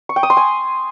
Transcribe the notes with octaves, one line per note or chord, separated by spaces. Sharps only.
C#6
G5
D#6
C6
G#5